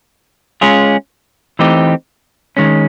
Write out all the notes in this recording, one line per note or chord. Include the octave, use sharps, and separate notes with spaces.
G#3 C#4 F4 G#4
E3 A3 C4 D#4 G4
D#3 G#3 C#4